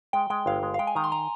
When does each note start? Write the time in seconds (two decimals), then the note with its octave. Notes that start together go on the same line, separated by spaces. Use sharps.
0.13 G#3 G5
0.30 G#3 G5
0.46 G1 F5
0.63 G#3
0.74 F5
0.79 G#3 G5
0.87 G#5
0.95 D#3 A#5
1.04 C6
1.12 A#5